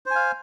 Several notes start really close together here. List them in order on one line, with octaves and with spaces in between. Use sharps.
C5 G#5 F5